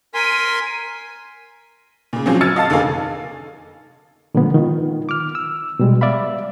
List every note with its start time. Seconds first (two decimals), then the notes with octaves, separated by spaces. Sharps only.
0.14 A#4 G#5 C6 B6 D#7
2.13 A#2 C#3
2.26 A#2 F3 F#3 C4 C#4 G#4
2.41 E6 F6 G#6 A6 C#7 D#7
2.56 D#5 F5 A5 A6
2.70 F1 D3 D#3 A#3 G#4 F5
4.35 A#2 D3 F3 G#3 B3
4.54 D#3 F4
5.09 D6 F6
5.35 E6
5.79 B2 G3 G#3
6.01 D5 E5 F5 B5